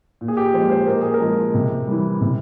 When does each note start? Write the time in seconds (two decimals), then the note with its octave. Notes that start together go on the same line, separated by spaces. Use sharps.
0.21 A#2
0.28 G#4
0.37 G4
0.54 F3 G#3 C5
0.71 C5
0.87 A#2 A#4
1.01 G#4
1.14 A#4
1.21 F3 G#3
1.54 C3
1.88 E3 G3
2.21 C3